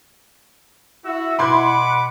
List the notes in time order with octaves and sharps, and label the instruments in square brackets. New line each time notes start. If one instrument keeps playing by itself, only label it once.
[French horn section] E4 [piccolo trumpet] F#4 [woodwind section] E6
[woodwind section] B2 B4 F#5 [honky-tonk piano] B5 C6 G#6 [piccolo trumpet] D6